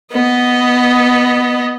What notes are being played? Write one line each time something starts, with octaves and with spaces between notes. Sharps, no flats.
B3 D#5